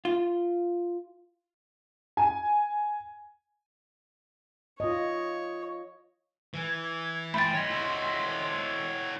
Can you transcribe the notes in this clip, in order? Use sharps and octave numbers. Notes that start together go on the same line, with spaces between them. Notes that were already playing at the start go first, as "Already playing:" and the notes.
F4
G#5
F4 C#5 D#5
E3 G#6
A3 G5 B5 C6 A6
C#5 D#5
E4 F#4